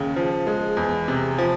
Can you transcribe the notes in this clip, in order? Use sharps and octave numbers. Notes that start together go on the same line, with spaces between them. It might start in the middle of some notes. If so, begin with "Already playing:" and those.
Already playing: D#2 C#3
F3
G#3
E2
C3
F3